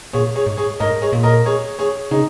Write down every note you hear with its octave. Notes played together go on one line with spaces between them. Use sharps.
A#2 G#4 C#5
G#4 C#5
G#2
G#4 C#5
G#2 A#4 D#5
G#4 C#5
A#2
A#4 D#5
G#4 C#5
G#4 C#5
C#3 D#4 G#4